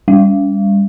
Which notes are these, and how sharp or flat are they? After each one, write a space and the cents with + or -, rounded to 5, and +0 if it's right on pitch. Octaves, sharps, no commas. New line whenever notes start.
G3 +30